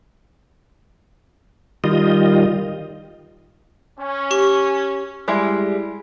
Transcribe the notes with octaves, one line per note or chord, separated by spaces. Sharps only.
D#3 G3 F4 D#5
C#4
G4 C#6
G3 G#3 E4